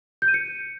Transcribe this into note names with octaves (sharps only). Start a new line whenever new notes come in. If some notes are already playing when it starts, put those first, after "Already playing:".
G6
D#7
C#7